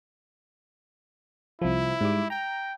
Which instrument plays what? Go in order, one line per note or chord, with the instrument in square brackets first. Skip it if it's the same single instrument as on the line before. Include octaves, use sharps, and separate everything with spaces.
[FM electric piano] C2 F3 [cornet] E4
[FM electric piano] G#2 G3 D6
[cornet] G5 [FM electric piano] A#5